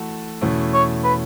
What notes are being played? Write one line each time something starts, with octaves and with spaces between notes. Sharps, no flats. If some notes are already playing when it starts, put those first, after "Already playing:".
Already playing: E3 A3 F#4 A4
E2 B2 A3 C#4 E4
C#5
B4